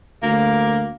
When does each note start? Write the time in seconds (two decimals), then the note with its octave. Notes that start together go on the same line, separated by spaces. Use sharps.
0.23 D2 A#3